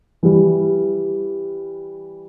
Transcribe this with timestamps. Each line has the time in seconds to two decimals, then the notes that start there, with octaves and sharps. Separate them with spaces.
0.23 E3 G3